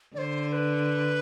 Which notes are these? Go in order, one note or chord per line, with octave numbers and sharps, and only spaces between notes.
D3 C5 D5
C5
B4